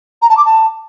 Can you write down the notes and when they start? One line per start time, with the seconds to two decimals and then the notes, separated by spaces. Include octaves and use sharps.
0.22 A#5
0.30 A5
0.37 D6
0.45 A5